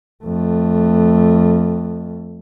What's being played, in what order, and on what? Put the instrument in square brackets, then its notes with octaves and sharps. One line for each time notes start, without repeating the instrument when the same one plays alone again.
[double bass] F2 A3